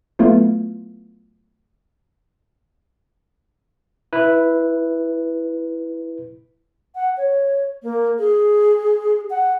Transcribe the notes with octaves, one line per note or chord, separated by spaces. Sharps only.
F#3 A3 B3 E4 F4
E4 B4
F#5
C#5
A#3
G#4
F#5